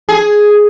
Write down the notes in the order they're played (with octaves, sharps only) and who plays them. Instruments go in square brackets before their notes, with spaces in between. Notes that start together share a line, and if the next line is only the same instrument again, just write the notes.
[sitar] G#4